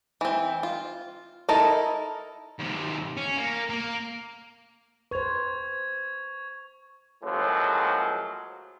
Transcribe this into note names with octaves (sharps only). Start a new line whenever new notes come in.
E3 C4
F4
D#4 E4 A4 A#4
D#2 C3
C#4
A#3
A#3
B4 C5 C#6 G#6 F7
A2 C#3 F3 F#3 G#3 A#3